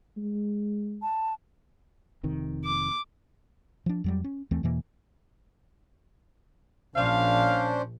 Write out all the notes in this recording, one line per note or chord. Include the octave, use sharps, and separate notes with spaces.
G#3
A5
F1 C3 D#3
D6
F3 D4
F2 F#3 G3
C#4
D#2 E3 A3 C4
E2 B2 E3 A#3
A#1 C#4 D4 C5 F5